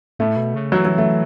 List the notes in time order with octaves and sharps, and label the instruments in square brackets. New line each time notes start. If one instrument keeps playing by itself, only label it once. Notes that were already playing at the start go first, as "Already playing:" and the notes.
[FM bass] A2 [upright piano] A3
[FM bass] B2
C#3
[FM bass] E3 [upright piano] F#3
[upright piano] F#3
A3